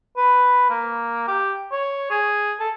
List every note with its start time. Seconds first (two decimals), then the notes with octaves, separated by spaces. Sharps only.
0.17 B4
0.70 A#3
1.28 G4
1.72 C#5
2.11 G#4
2.60 A4